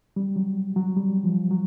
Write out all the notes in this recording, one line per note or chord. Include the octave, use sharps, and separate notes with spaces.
G3
F#3
F#3
G3
F3
F#3